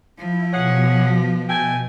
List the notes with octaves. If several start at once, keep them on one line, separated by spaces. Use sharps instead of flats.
F3 E4
B2 G#4 C#5 F#5
A3 G5 G#5